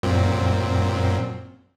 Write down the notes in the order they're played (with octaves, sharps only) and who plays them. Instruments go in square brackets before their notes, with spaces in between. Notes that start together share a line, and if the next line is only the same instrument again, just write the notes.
[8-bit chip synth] F#2 A#2 C4